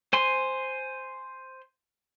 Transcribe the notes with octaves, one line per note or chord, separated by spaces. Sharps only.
C5 G#5 C6